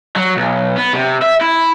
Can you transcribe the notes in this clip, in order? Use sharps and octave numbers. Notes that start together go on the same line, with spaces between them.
F#3
B1
B3
C3
E5
E4